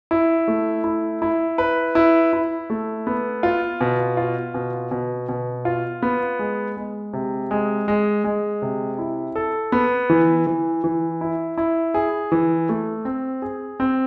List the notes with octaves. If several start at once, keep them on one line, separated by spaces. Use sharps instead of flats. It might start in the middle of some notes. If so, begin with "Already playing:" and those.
E4
A3
E4
E4
B4
E4
E4
A3
B3
F4
B2
F4
B2
B2
B2
F4
B3
G#3
G#3
C3
G#3
G#3
G#3
C3
E4
A4
B3
E3
E3
E3
E4
E4
G#4
E3
A3
C4
G#4
C4